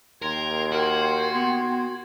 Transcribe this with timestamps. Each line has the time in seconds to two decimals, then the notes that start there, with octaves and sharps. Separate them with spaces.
0.22 D#2 A#4 G5 C6 G#6
0.72 F#4 A#4
1.34 B3